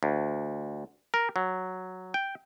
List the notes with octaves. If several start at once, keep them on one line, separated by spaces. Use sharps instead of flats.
D2
A#4
F#3
G5